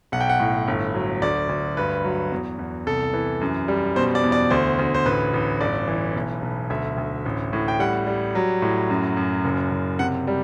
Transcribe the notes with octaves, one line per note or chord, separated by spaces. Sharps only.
B1 F#5
G5
F#5
A2
G1
F#3
D2 D5
D2
G2 B4
F#3
E2
E2
C2 A4
E3
F#2
G3
B2 C5
D5
E2
D5
D2 C5
D2
C5
A1 B4
A1
G1 D5
E3
B1
B1
D2 E5
D2
A1
A2
G5
G3 F#5
G3
F#3
A2
F#2
F#2
F#1
F#1
C3 F#5
G3